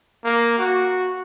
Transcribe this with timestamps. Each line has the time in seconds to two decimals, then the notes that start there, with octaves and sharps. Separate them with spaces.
0.24 A#3
0.58 F#4